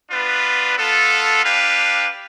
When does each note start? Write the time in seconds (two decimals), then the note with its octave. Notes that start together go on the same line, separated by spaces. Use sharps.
0.11 B3 D4 F4 B4
0.77 B3 F4 A4
1.43 D4 G4 B4 F5